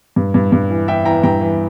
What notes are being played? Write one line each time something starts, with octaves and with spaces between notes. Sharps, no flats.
G2
G2
G2
E3
E3 E5 G5
E3 G5 A#5
G2 G5 A#5
E3